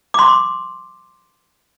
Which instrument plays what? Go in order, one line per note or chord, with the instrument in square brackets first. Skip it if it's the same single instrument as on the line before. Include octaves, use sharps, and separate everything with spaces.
[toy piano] C6 D6